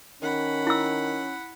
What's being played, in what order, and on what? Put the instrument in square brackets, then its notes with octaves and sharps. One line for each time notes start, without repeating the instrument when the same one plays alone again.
[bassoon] D#3 [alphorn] C#4 [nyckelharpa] F#5 B5
[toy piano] E4 E6